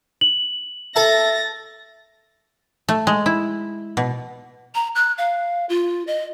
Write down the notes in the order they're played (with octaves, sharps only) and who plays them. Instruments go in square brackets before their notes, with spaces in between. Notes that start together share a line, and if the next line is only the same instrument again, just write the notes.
[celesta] F#7
[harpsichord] A4 A5 [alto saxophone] E5 [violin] A6 A#6
[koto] A3
G#3
E4
B2
[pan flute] A#5
F#6
F5
F4
D#5